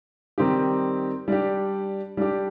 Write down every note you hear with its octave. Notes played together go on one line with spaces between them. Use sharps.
D#3 G3 C4 D#4 G4
G3 D4 G4
G3 D4 G4